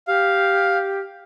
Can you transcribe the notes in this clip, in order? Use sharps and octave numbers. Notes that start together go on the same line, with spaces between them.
G4 F5